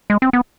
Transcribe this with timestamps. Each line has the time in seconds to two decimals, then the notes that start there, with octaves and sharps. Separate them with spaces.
0.10 G#3
0.22 C4
0.33 B3